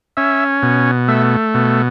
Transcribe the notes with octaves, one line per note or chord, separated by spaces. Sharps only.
C#4 E5
B2
A3 E5
B2